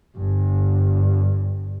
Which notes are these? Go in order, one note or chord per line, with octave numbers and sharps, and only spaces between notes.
G1 G2